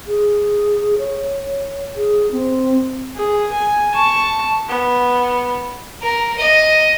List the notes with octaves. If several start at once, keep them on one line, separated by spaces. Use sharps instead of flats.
G#4
C#5
G#4
C4
G#4
G#5
A5 C#6
B3
A#4
D#5